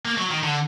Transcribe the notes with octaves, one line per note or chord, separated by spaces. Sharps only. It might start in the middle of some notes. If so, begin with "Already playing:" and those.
A#3
F#3
D#3
D3